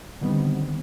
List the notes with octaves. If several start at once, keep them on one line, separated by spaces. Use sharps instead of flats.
D3 D#3 G3 B3 C4